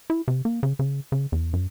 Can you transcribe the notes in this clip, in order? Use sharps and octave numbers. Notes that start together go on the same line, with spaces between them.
E4
C3
A#3
C#3
C#3
C#3
E2
F#2